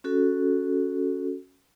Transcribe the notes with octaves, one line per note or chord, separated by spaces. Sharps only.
C#4 F#4 A4